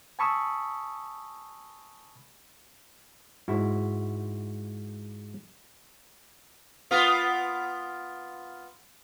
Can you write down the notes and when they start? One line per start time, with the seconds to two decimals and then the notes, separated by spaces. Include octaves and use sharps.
0.19 G#5 A5 B5 C#6 D#6 E6
3.48 G#2 E4 F#4
6.91 B3 F4 A#4